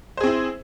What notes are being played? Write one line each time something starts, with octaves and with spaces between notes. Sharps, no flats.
C4 E4 G#4 C5